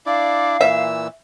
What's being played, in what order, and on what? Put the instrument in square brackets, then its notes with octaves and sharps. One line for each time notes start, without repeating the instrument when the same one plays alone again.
[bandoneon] D4 E4 D5 [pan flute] F5
[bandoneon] A#2 E3 E6 [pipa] E5